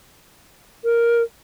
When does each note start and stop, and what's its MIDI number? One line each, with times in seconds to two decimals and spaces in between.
0.84 1.22 70